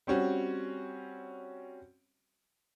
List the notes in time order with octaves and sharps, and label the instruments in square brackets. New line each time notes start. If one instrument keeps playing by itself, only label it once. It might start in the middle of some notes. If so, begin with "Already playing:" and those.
[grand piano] G3 C4 C#4 F#4